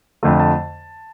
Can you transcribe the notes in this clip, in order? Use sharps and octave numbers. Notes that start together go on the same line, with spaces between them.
F2 D3 A3
A5